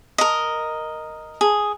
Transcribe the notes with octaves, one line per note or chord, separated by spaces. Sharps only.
A#4 D#5
G#4